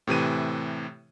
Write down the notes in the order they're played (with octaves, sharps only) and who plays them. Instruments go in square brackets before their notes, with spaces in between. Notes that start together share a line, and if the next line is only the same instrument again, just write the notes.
[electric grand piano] A2 C3 E3 D#7